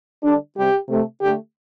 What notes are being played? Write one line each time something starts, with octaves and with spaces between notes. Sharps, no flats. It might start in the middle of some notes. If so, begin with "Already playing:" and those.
D3 G3 D4
C3 G3 G4
C3 A3
D3 A3 G4